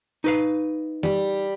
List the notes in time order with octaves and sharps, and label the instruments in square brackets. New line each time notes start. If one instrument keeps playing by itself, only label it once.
[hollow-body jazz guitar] D#4 B4 F5
[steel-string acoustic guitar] G3